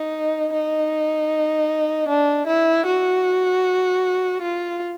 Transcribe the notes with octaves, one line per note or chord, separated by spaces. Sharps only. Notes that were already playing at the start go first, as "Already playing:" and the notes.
Already playing: D#4
D#4
D4
E4
F#4
F4